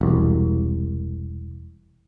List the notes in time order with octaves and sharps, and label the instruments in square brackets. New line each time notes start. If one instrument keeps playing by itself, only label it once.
[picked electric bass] E1 C2